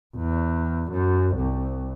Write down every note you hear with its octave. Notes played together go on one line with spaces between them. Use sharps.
E2
F#2
C2